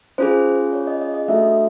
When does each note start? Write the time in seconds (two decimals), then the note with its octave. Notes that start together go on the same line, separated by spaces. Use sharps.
0.18 C#4 F4 G#4 C5
0.73 C#5
0.87 D#5
1.01 D#5
1.14 D#5
1.28 A3 D4 F#4 A4 E5